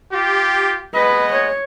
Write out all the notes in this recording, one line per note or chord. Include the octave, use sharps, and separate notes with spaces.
F4 G4
G#3 B3 B4 D#5
C#5